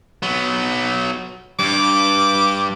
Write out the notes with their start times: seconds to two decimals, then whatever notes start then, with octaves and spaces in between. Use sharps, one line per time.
0.23 F#3 B3
1.59 G2 D6